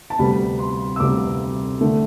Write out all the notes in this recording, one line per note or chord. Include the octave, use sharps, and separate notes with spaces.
A5
D2 C3 G3 B3 B5
C6
E6
D2 C3 G3 B3 D6
D3 A3